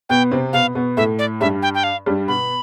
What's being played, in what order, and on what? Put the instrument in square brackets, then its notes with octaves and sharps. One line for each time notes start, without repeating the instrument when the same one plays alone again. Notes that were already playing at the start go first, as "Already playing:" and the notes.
[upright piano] B2 B3 [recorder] G5
[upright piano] C3 C4
[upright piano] B2 B3 [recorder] F5
[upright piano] B2 B3
[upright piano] A2 A3 [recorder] E5
[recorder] D5
[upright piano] G2 G3 [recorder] E5
[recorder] G5
G5
F5
[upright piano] G2 G3
[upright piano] B2 B3 [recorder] B5